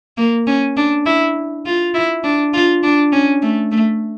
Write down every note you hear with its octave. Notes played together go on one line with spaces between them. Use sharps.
A#3
C#4
D4
E4
F4
E4
D4
F4
D4
C#4
A3
A3